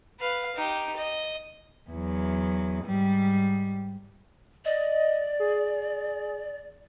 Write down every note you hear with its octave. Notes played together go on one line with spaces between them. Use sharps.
B4 F5
D#4 G4
D#5
E2 F#3
G#2 G3
D5 D#5
G#4